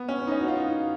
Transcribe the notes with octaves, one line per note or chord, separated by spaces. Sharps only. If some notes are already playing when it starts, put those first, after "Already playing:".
Already playing: B3
C#4
D#4
C#4
F#4
F4
D#4